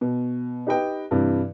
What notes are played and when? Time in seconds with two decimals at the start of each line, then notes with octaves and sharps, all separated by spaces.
0.01 B2
0.67 D#4 G4 B4 D#5 G5
1.11 G2 C3 E3